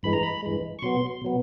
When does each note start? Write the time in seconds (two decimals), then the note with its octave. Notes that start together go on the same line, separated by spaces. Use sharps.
0.03 G2 E3 G#3 B5
0.13 A#5
0.23 B5
0.42 G2 E3 G#3
0.79 C#6
0.82 B2 F#3 B3 C6
1.22 B2 F#3 B3